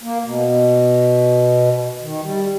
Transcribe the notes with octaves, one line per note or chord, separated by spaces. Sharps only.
A#3
B2
D#3
G3